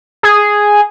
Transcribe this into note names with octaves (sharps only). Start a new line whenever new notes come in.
G#4